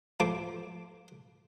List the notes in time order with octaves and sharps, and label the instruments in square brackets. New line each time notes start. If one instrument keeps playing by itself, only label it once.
[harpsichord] F3 A3 C5 D6